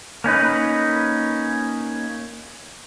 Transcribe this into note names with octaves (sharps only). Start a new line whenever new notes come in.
A#3 C#4 D#4 B4